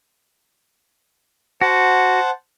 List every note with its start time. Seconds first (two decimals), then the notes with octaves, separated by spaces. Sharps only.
1.61 F#4 C5 F#5 A5